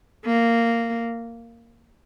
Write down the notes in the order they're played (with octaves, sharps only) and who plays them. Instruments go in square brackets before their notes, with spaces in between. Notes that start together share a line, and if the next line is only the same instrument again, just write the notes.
[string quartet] A#3